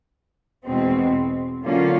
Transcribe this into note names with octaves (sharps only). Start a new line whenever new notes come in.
E2 B2 G#3 C4
D3 F#3 A#3 C#4 F4